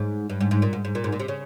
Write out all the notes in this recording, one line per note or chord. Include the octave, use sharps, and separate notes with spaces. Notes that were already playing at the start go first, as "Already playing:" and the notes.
Already playing: G#2
G2
G#2
G#2
A#2
G#2
G#2
A#2
G#2
A#2
C3
C#3